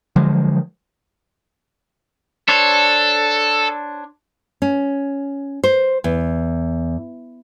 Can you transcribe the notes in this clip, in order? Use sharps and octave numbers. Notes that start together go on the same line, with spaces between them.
D3 F3 F#3 G#3
D4 A4 C5 C#5
C#4
C5
E2